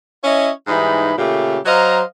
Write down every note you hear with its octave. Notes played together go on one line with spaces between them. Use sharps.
C#4 E4 C#5 D#5 E5
G#2 E3 G3 D#4 B5
A#2 C#3 A3 G4
F#3 C5 D#5 F5 A#5